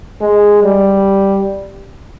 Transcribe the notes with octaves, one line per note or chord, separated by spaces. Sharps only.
G#3
G3